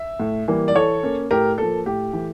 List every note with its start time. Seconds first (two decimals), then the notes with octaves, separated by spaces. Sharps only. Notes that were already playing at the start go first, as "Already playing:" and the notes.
Already playing: E5
0.20 A2
0.48 E3 G3 A#3
0.68 D5
0.75 E3 A4 C#5
1.03 A#3 C#4
1.31 A2 G4 A#4
1.58 F3 A#3 A4
1.86 A2 G4
2.13 E3 A3